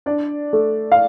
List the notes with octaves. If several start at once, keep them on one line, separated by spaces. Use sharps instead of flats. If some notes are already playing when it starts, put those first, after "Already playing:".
D4 D5
A3
F5